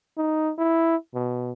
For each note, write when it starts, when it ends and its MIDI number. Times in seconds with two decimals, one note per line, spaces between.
0.18 0.52 63
0.58 0.96 64
1.14 1.52 47